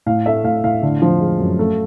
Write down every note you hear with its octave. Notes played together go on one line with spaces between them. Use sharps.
A2 F5
A3 E5
A2 F5
A2 F5
D3
F3
G#3
F#2
A3